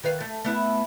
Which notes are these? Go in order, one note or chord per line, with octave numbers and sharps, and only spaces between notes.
D#3 B4 F5
A3
A3 B3 E4